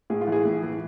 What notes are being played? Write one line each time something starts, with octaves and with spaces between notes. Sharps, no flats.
A2 G#4
F4
E3 G#4
A2
E3